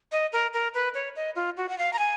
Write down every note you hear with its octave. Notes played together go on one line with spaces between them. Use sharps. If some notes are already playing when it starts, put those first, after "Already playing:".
D#5
A#4
A#4
B4
C#5
D#5
F4
F#4
F#5
F5
A#5
G#5